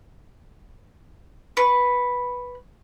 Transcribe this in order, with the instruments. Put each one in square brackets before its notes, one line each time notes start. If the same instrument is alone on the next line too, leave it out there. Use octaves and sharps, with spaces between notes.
[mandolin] B4 C#6